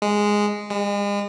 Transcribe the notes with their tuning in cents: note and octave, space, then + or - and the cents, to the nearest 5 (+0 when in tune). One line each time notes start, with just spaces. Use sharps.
G#3 -5
G#3 -40